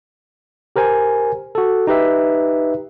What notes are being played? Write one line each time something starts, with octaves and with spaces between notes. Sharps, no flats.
G4 A#4 C5 G#5
F#4 A4
D#4 G4 B4 E5